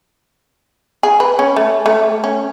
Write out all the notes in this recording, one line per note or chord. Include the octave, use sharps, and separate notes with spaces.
G#4
B4
C#4
A3
A3
C#4